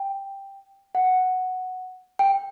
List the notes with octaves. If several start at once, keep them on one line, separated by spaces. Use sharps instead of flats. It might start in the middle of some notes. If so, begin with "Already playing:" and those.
Already playing: G5
F#5
G5